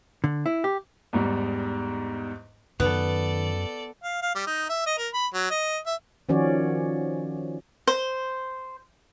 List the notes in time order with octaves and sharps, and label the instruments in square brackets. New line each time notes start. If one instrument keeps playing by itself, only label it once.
[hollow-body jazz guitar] D3
E4
G4
[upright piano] E2 G#2 G3
[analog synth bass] F#2 [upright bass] D#3 [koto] B3 [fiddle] A4 D5
[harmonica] F5
F5
G3
D#4
E5
D#5
A#4
B5
F#3
D#5
E5
[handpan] D#3 F3 C#4 F#4 C#5 D5
[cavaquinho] C5